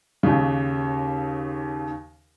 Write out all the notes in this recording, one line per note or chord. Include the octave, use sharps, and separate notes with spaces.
D#2 C#3